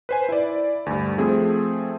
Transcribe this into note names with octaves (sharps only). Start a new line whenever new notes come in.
B4 C5 G#5
E4 D5
D2 G2
F3 A3 C4 G#4